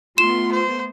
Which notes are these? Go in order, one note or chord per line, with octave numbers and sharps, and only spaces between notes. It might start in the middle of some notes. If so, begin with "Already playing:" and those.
A3 B3 F4 C6 E7
C5